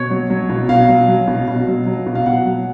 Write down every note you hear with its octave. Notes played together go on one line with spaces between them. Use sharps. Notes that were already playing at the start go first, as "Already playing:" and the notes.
Already playing: B2 C#5
F#3
F#3
B2
B2 F5
F#3
F#3
B2
B2
F#3
F#3
B2
F5
B2 F#5
F#3